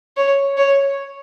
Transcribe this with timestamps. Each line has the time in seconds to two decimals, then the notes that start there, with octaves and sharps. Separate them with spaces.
0.17 C#5
0.58 C#5